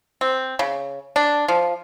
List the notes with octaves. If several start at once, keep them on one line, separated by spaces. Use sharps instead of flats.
C4
C#3
D4
F3